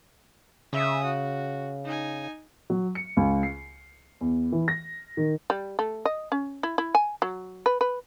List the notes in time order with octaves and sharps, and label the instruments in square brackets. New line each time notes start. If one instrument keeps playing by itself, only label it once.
[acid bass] C#3 [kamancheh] E5 D#6
[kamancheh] F#4
D#4 G#5
[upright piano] F#3
C#7
C#2
C7
E2
E3
A#6
D#3
[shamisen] G3
A3
D#5
C#4
E4
E4
G#5
F#3
B4
B4